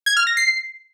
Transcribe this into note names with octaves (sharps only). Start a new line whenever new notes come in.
G#6
F6
A#6
C7